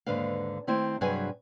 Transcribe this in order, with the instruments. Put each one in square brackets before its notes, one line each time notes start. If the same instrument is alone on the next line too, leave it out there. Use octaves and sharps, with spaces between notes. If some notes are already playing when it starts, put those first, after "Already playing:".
[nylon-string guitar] D#2 G#2 D3 D4 B4 F5
D#3 A3 C4 E4 E5
G2 C3 F#3 G#4 B4 G#5